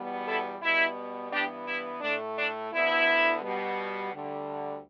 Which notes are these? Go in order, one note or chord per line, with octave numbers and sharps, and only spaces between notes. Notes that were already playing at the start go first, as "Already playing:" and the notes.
Already playing: E2 B2 G3 B3
E4 A4
B2 G3 B3 E4
G2 E3 B3 D4 G4
E4
A2 A3 D4
D4
D2 D3 B3 E4
B2 G3 B3
D2 D3 G3